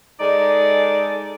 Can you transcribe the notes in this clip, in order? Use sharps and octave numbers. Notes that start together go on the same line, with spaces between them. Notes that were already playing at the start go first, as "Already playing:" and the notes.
G#3 D#4 A4 D5